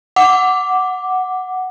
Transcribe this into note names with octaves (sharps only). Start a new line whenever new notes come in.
F#5 D6